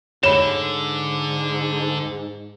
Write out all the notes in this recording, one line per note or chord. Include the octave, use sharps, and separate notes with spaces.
G#2 D3 C#5 B5 E7